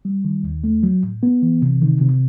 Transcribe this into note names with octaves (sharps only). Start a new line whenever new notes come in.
G3
D#3
D#2
A3
F#3
A2
B3
E3
C3
D#3
C3